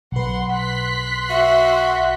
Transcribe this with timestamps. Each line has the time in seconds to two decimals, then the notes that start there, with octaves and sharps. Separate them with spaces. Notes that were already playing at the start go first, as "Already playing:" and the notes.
0.12 B1 B4 F#5 C6
0.53 C6 F#6 B6
1.30 F#4 E5